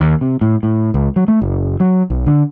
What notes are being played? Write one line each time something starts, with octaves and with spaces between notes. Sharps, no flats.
D#2
C3
A2
A2
C#2
F#3
A3
F#1
F#3
B1
D3